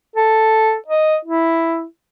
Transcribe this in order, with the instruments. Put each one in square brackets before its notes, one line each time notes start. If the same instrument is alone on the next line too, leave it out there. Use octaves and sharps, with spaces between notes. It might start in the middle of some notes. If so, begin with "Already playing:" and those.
[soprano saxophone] A4
D#5
E4